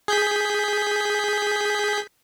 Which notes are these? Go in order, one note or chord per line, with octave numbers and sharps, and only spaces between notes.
G#4 G6 B6